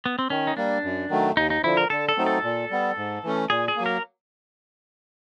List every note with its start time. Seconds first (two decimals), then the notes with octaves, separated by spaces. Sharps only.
0.06 B3
0.19 C4
0.30 D#3 C#4
0.47 D#4
0.57 G3 A#3 D4
0.84 F#2
1.10 D#3 F#3 A3
1.36 D#2 D#4
1.50 D#4
1.63 D3 F3 E4
1.77 A#4
1.90 D3 A4
2.09 A4
2.17 F#3 A3 C4 D#4
2.26 A4
2.44 A#2
2.71 G3 B3
2.97 G#2
3.23 E3 A3 C#4
3.50 A#2 G#4
3.68 G#4
3.76 F#3 A#3
3.86 A#4